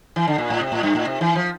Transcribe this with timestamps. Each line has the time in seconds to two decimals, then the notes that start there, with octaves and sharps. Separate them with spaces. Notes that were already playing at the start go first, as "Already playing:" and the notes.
0.16 E3
0.28 D3
0.38 A#2
0.50 A2
0.61 C3
0.72 A2
0.83 G2
0.95 A2
1.05 C3
1.21 E3
1.36 F3